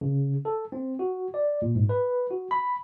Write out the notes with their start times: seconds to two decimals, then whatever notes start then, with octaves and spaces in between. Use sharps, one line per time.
0.01 C#3
0.45 A4
0.72 C4
0.99 F#4
1.34 D5
1.62 A#2
1.75 G#2
1.89 B4
2.31 F#4
2.51 B5